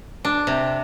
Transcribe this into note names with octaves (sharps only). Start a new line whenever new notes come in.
D4
C3